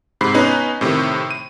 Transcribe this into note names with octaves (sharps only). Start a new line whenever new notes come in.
G#2 C3 B5 C7
B3 C#4 D#4 B4
A2 C3 D#3
D#7